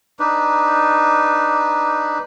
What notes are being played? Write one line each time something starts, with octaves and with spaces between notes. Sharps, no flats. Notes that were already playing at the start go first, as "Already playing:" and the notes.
D4 D#4 B4